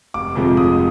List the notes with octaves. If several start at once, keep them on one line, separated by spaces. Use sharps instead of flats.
F1 D6
F2 C3 F3 G#3
F1 D#6